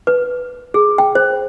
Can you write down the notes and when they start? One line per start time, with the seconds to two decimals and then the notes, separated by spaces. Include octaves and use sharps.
0.07 B4
0.74 G#4
0.98 G5
1.15 C5